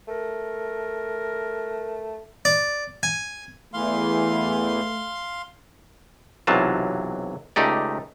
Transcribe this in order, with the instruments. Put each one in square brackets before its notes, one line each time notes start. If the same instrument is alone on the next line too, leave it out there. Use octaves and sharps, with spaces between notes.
[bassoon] A3 [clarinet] A#4
[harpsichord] D5
G#5
[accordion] E2 E3 [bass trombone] A3 [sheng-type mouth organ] F5 C6
[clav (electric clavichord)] B1 C3 E3 F#3 F4 A5
C#2 A3 D#4 G4 D5